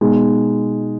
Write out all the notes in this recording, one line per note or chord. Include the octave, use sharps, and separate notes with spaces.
B2 G#3 D#4